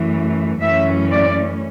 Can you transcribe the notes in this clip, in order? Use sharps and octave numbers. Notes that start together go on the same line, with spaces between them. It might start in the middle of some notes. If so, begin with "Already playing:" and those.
Already playing: F#2 E3 A3
F#2 E3 A3 C#4 E5
D5